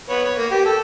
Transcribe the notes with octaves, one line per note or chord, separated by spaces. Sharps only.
B3 C#5
C#5
A#3
G4
A4